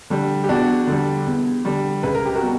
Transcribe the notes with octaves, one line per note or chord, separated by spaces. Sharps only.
D3 G3
G4
E2 D4 F#4
D3 G3
E2
D3 G3
C#2 B4
A#4
G4
F#4 A#4
B2 G3